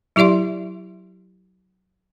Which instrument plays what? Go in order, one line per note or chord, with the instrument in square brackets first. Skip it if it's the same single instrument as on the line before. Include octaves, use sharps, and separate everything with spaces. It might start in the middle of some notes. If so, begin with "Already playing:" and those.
[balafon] F#3 E4 G4 D5 E5 C6